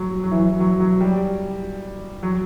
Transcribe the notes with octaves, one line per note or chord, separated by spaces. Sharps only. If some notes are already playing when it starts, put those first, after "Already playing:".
Already playing: F#3
F#3
E3
F#3
F#3
F#3
G3
F#3